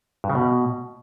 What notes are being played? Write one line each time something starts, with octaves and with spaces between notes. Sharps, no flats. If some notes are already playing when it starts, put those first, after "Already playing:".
G2
C#3
B2